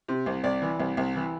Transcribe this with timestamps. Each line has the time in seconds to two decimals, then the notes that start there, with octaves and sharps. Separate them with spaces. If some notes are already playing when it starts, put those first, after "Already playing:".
0.08 C3
0.26 C2
0.44 C2 D5
0.62 E3
0.80 C2
0.97 C2
1.16 E3